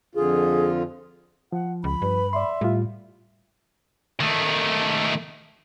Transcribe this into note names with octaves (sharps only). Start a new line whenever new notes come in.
F2 D3 F4 G#4
F3 F#5
C#2 B5
G2 B4
D5 E5 C6
A2 G3 F4
D#3 A3